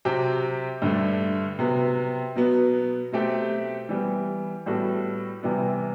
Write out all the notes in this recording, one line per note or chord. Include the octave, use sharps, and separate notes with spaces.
C3 F#3 C4 G4
G2 D3 A3
C3 F#3 B3
B2 F#3 B3
B2 F#3 A3 C4 G4
E3 G3 B3
A2 G3 B3 F#4 A4
C3 E3 G3 B3